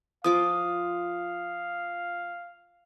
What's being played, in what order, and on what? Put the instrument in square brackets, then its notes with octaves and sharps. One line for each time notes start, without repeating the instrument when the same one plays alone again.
[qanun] F3 F4 D6 [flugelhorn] F5 [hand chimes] D#6